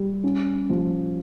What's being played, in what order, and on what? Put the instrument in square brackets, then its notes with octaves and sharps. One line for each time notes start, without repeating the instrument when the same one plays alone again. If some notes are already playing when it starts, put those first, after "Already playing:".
Already playing: [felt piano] G3
C#4
F3